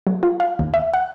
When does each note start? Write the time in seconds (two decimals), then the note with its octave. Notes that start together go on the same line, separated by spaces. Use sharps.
0.07 F#3
0.23 F4
0.40 F5
0.59 D#2
0.74 E5
0.94 F#5